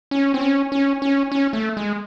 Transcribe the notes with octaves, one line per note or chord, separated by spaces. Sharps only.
C#4
C4
C#4
C#4
C#4
C#4
A3
G#3